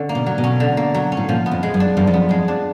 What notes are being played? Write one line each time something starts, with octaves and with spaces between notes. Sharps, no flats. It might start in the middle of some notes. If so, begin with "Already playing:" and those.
Already playing: D3 C#4
A#3
B2
F#3
B2
C#4
D3
A#3
F#3
C#4
A2
A#2 F3
B3
F2
G#3
F#2
D4
F#2 F3
F2
B3
F2 G#3
D4